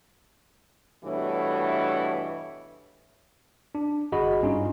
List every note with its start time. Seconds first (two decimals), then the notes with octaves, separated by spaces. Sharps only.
1.04 G2 B2 E3 A3 C#5
3.75 D4
4.12 G1 F#4 G#4 D#5 B5
4.42 G2 C#4 D#4 F4